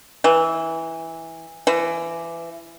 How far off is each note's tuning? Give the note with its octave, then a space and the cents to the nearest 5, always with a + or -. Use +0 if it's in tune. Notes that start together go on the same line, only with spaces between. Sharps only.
E3 -10
E3 +25